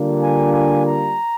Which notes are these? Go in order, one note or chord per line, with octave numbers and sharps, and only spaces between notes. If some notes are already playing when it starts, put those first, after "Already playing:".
Already playing: D3 G3 A#3 D4 F4
G#5
G#5
A#5